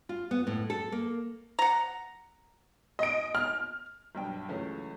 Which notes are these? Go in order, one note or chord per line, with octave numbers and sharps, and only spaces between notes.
F4
B3
A2
A4
A#3
F#5 A#5
D#5 D7
F6
B1 G2 G5
C#2 E3 F#3 A3 C#4 G#4